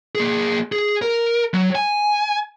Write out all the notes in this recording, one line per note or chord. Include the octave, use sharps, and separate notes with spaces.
A#3 G#4
G#4
A#4
F#3
G#5